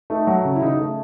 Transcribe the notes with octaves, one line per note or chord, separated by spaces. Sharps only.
A3 D#4
F#3
C#3
E4
C#3 D#4
A3